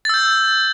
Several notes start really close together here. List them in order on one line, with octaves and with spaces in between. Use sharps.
A6 E6 G6